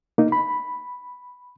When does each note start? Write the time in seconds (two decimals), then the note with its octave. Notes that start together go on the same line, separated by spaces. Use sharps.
0.18 A#3 D#4
0.32 B5